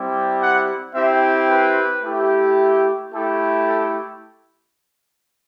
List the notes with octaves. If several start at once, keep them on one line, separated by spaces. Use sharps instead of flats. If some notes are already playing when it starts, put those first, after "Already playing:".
Already playing: G3 C4 E4 G4
F#5
C4 E4 G4 E5
B4
A3 E4 G4
A3 E4 G4 A4
A4